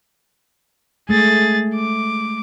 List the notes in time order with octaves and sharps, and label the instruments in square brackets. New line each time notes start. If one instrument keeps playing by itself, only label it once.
[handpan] G#3 A3 [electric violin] G#4 A6
[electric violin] D6